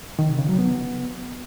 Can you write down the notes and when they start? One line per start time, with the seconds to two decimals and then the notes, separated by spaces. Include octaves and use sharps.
0.19 D#3
0.29 C3
0.39 C#3
0.49 F#3
0.58 B3